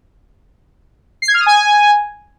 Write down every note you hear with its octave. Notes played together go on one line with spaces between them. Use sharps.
C7
G#6
F6
D#6
G#5